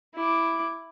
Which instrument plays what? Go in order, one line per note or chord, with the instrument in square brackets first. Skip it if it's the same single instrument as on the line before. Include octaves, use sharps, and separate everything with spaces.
[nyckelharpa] E4 D6